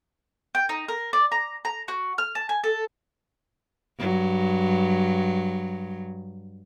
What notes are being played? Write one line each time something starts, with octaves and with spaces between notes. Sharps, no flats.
G5
D#4
A#4
D5
A#5
A#5
F#4
F6
A5
G#5
A4
G2 F#3